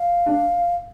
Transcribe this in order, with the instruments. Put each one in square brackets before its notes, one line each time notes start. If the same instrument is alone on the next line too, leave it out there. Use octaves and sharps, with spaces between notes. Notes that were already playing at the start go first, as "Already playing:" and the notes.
Already playing: [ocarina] F5
[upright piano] D4